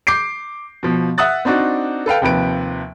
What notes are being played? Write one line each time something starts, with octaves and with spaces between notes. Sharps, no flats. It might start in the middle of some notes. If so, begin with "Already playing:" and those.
D6 G6 C7 D7
B2 F3
E5 F#5 D#6 F#6 A6
C4 D4 D#4 F#4
A4 B4 F5 G5
D#2 C3 F3 B4 D7